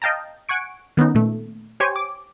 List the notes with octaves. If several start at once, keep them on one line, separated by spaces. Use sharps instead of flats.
D#5 F5 G5 A5 A#5
F#5 G#5 C#6 D7
D#3 B3 C#4 D#4
A#2 A3
G4 C5 C#5 G5 G#5
D6